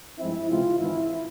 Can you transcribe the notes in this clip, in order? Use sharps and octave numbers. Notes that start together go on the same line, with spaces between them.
G2 F3 G#3 C4 E4
C#2 C3 E3 G#3 F4
G#1 G#2 E3 E4